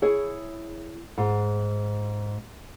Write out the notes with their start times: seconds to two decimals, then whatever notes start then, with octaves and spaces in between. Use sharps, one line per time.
0.02 E4 G#4 C#5
1.18 G#2